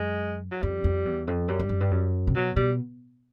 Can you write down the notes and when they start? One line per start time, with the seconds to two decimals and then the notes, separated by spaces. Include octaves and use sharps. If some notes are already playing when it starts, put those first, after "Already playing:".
Already playing: F#2 G#3
0.51 F#3
0.62 F2 G3
0.84 F2
1.05 E2
1.27 F2
1.48 F#2 G3
1.59 G2
1.69 F#2
1.80 G2
1.91 F#2
2.27 C3
2.34 B2 F#3
2.56 B2 G3